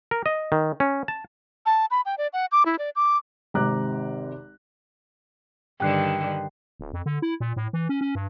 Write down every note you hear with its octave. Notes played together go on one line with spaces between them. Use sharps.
A#4
D#5
D#3
C#4
A5
A5
B5
G5
D5
F#5
D6
E4
D5
D6
G#1 C3 G4 A#5 D6 F#6
G2 D3 D#3 G5 F#6 C7
D1
F2
D3
E4
A#2
A2
E3
C#4
C#4
G2